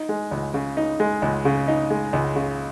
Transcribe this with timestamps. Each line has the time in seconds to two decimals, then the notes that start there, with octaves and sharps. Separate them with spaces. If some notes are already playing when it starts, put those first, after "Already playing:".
Already playing: D#4
0.09 G#3
0.31 C#2
0.54 C#3
0.77 D#4
1.00 G#3
1.22 C#2
1.45 C#3
1.68 D#4
1.90 G#3
2.13 C#2
2.36 C#3